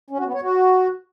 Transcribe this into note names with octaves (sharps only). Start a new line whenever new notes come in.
C#4
F#4
B3
C#5
F#4